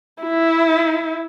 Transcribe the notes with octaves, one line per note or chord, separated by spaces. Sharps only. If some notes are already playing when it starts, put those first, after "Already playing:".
E4